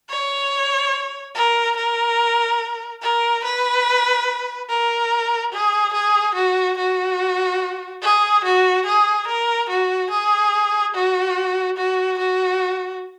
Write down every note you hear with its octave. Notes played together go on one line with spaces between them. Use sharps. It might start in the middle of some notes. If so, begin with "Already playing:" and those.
C#5
A#4
A#4
A#4
B4
A#4
G#4
G#4
F#4
F#4
G#4
F#4
G#4
A#4
F#4
G#4
F#4
F#4
F#4